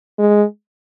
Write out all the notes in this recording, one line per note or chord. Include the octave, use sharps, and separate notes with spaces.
G#3